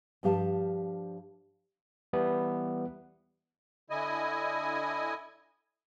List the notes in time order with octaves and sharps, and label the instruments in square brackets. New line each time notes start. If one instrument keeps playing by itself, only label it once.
[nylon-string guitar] G2 F3 G4 F5 A5
[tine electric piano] E3 G3 B3 E4
[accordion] D3 E4 D#5 G#5